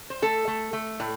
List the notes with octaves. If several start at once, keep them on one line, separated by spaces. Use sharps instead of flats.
C5
A3 A4
A3
A3
A2